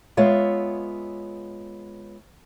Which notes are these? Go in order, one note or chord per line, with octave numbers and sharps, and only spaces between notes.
G#3 B3 F4 C#5 E5